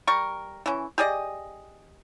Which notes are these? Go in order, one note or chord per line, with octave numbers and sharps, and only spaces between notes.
G3 A#4 C#6
E3 C#4
G4 G#4 D5 D#5